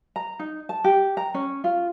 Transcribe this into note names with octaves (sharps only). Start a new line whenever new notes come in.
A#5
D#4
A5
G4
A#5
C#4
F4